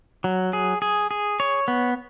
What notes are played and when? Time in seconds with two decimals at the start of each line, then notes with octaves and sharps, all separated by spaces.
0.24 F#3
0.53 G#4
0.82 G#4
1.11 G#4
1.40 C#5
1.68 B3